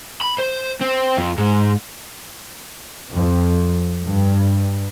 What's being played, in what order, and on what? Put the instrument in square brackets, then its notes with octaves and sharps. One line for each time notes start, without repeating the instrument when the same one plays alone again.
[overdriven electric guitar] B5
C5
C4
F2
G#2
[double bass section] F2
G2